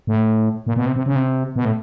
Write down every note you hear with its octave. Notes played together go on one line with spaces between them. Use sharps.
A2
A#2
B2
C3
C3
C#3
C3
B2
A2